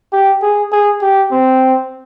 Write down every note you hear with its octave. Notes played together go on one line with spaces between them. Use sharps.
G4
G#4
G#4
G4
C4